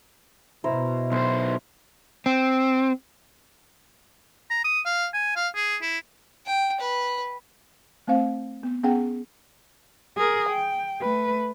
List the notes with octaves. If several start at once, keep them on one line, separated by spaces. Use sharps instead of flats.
B2 E4 C5 A#5
B1 C5 C6
C4
A#5
D#6
F5
G#5
F5
G#4
E4
G5
B4
A3 C4 C5 F5
B3
B3 C#4 G#4 F#5 G5
G#4 A#4
G5
A3 B4